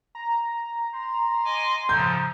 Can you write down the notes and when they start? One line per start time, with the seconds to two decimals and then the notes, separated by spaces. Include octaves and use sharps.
0.15 A#5
0.94 C6
1.45 D#5 G#5 D6
1.89 A2 C#3 F3 A#5 G6